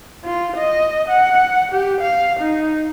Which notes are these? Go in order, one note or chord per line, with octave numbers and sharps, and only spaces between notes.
F4
D#5
F#5
G4
F5
D#4